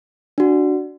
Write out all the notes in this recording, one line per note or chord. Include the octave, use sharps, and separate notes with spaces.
D4 F#4